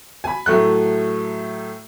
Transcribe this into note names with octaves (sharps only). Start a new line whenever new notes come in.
G#5 B5
A2 F#3 A3 F#6